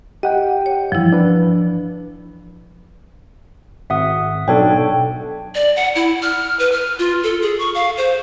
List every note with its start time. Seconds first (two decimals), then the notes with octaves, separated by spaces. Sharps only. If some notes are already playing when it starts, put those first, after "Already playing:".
0.23 G4 D#5 F#5 G5
0.66 C#5
0.92 G2 E3 F3 E4
1.13 F3 D4 B4
3.90 G#1 E5 F#5 D#6
4.48 B1 D4 A4 C#5 G5
5.55 D5
5.76 F#5
5.95 E4
6.22 F6
6.59 B4
6.72 F6
6.99 F4
7.23 A4
7.42 G#4
7.59 C#6
7.75 F5
7.97 C5